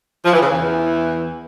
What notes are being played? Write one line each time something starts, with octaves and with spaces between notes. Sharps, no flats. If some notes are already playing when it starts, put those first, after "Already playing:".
F3
E3
C#3
E2 E3